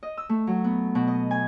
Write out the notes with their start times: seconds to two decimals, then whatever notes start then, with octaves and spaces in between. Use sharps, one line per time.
0.03 D#5
0.18 E6
0.29 A3
0.47 F#3
0.64 B3
0.95 B2
1.07 D#5
1.31 G#5